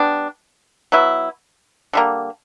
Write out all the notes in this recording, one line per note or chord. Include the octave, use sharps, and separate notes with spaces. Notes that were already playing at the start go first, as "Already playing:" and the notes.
Already playing: G3 B3 D4
F#3 B3 E4
D3 G3 A#3